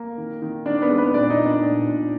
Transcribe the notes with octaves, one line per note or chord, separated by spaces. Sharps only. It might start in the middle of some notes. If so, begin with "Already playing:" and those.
Already playing: A#3 A#4
D#3
D#3
D#3 D4 D5
B3 B4
G#3
B3 B4
A#2 D4 D5
D#4 D#5
A#2
D4 D5
A#2
A#2